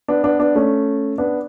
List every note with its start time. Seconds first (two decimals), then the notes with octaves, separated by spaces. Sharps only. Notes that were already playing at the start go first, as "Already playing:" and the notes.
0.08 B3 D4
0.24 B3 D4
0.40 B3 D4
0.55 A3 C#4
1.18 B3 D4